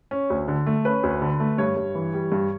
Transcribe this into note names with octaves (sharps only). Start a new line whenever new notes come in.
C#4
D2
D3
A3
C#4 B4
D2
D3
A3
G2 C#5
G2
E3
G3
G2